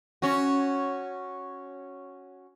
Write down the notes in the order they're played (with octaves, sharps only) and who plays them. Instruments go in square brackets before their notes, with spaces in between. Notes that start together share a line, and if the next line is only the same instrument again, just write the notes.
[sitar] C#4 F#4